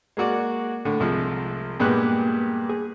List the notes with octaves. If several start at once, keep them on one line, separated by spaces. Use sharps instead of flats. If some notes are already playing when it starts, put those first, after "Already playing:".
G#3 A#3 F#4 D5
A2 D3
C2 F3 G#3
G2 A#2 G#3 B3 G4 F#6
G#4